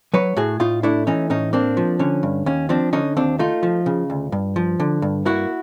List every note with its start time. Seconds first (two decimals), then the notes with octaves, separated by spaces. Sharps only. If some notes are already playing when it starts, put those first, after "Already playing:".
0.14 F#3 B4 C#5
0.37 A2 F#4 G#4
0.60 A2 D#4 F4
0.83 A3 D4 E4
1.07 E3 C#4 D#4
1.30 A2 C#4 D#4
1.53 A#3 C4 D4
1.77 F3
1.99 D3 C#4
2.23 G2
2.46 D#2 C#4
2.69 F3 C4 D4
2.93 D3 C#4 D#4
3.17 D#2 C4 D4
3.39 A3 D#4 F4
3.63 F3
3.86 C#3
4.10 D2
4.32 G2
4.56 F3
4.80 D3
5.02 G2
5.25 A#3 E4 F#4